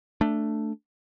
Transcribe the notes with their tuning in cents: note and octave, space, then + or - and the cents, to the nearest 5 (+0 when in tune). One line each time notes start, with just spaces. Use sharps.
A3 +5 D4 +0